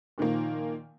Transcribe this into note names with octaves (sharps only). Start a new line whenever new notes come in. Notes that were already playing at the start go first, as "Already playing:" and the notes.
A#2 D#3 F3 A#3